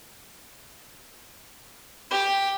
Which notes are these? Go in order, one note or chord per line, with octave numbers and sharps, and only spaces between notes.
G4